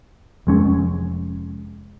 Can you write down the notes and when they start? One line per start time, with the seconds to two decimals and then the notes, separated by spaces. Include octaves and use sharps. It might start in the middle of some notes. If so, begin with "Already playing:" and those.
0.47 F1 G#3 C#4